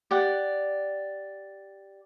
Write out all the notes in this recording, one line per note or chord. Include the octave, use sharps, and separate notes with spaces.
G4 D5 F#5